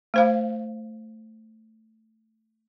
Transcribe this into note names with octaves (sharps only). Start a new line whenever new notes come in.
A3 C5 F5